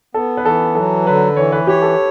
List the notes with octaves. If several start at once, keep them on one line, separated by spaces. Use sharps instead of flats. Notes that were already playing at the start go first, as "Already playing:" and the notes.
B3 A4
B4
E3 A4
F#3 A4
D3 B4
E3 C#5
B4
G4 C#5
A4